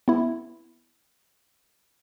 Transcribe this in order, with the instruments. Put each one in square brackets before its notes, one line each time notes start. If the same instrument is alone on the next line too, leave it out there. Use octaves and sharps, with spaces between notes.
[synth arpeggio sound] B3 E4